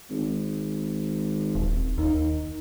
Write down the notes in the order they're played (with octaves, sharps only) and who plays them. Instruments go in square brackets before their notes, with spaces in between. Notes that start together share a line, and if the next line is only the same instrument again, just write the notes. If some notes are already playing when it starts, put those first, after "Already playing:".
[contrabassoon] G#1
[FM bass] D#1
[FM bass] D#2 [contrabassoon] D#3